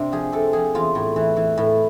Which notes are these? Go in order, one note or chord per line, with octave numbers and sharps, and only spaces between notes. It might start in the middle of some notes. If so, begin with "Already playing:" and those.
Already playing: C3 D4
F3 G#4
C3 A4
F3 G#4
E2 F4
A2
E3
E3
A2